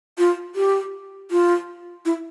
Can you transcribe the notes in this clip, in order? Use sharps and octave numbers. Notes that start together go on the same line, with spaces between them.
F4
G4
F4
E4